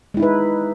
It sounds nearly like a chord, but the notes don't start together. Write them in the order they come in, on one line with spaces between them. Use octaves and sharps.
G#3 E4 D#4 B4